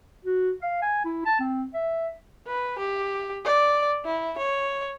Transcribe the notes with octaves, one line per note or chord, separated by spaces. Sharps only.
F#4
F5
G#5
E4
A5
C4
E5
B4
G4
D5
E4
C#5